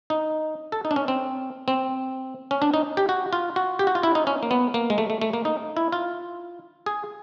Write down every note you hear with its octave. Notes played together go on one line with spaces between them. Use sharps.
D#4
A4
D#4
D4
C#4
C4
C4
C#4
D4
D#4
G4
F#4
F4
F#4
G4
F#4
F4
E4
D#4
C#4
A#3
B3
A#3
G#3
A3
A3
A3
A#3
D#4
E4
F4
G#4